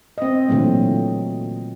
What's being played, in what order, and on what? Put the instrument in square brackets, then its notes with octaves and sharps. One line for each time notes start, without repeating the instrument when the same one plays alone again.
[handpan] C4 D#5
A#2 D3 E3 F#3 A3